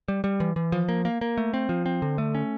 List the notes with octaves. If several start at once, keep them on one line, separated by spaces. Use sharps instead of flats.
G3
G3
E3
E3
F3
A#3
A#3
A#3
A3
C4
F3
C4
D3
A3
C#4